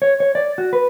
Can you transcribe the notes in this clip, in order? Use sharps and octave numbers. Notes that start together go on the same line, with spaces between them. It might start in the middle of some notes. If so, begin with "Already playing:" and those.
C#5
C#5
D5
F#4
B4